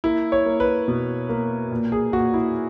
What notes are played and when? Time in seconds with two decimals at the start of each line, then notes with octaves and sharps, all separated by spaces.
0.04 A#3 E4
0.32 C#5
0.46 A#3
0.60 B4
0.88 B2
1.29 A#3
1.71 A#2
1.92 G#4
2.13 A#2 F#4
2.34 E4